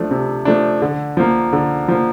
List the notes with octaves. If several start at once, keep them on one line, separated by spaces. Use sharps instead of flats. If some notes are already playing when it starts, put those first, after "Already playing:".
Already playing: F3 A3 D4
C3
F3 A3 D4
D3
F3 A#3
D3
F3 A#3